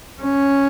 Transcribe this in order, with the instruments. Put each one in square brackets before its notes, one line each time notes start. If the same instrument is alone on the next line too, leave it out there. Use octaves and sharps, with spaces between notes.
[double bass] C#4